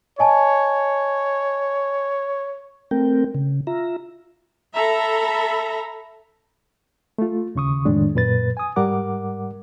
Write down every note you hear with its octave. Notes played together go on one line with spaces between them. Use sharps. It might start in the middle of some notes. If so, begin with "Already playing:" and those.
C#5 D#5 G#5 A5
A3 C4 A#4 G5
C#3
F4 E5 A#5
A4 E5 A#5 B5
A3 F4
D#2 C#3 C#6 D#6
F2 A2 D#3 G#3 D4
F#2 A#2 B4 A6
G#5 D#6
G#2 G3 A#4 F#5 D6